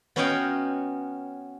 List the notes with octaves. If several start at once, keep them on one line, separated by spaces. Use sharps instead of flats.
B3 C#4 F#4 D#5 F5 G5